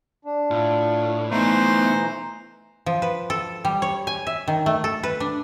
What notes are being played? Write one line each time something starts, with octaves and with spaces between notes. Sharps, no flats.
D4
A2 F4
B2 E3 A3 D#4 C5 A#5
F3
B4
A4
G3
C#5
G#5
E5
D#3
A3
A4
B4
D4